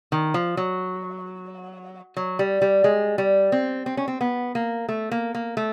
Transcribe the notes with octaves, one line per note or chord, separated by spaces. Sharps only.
D#3
F3
F#3
F#3
G3
G3
G#3
G3
C4
C4
C#4
C4
B3
A#3
A3
A#3
A#3
A3